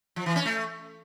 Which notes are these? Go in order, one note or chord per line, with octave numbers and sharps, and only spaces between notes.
F3
E3
C#4
A3